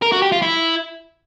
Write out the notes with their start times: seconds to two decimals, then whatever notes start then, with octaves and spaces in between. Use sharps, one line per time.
0.02 A#4
0.12 F#4
0.22 G4
0.32 F4
0.42 E4